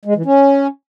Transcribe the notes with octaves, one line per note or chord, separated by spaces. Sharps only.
G#3
E3
C#4